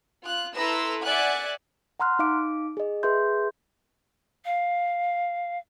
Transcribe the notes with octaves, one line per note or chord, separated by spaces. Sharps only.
F4 F#6
E4 A4 B4 A#5 C6 E6
D5 E5 F#5 G#5 F#6
F#5 A#5 C6 F6 F#6
D#4 F5 D6 D7
G#4 D#5
G#4 B4 E5 C6 G6
F5